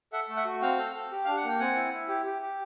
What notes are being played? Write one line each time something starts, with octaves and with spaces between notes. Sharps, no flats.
A4 E5 F#5
A3
E5 F#5
F#4
C4 F5 G5
A4
A4
G4
D4 F5
F#5
A#3 G5
C4 F#5 G#5
E4
E4
G4
G4
G4